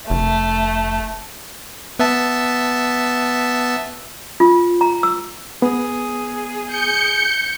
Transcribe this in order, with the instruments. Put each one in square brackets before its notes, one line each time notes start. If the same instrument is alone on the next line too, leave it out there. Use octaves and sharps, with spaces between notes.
[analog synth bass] F1 [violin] A3
[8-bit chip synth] B3 E5 A5
[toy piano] F4
A#5
E6
[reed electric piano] B3 [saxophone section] G#4
[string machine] G6 C#7